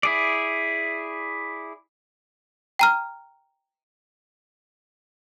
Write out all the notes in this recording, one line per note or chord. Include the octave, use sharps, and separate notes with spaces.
E4 G#4 D5
G5 A#5 F6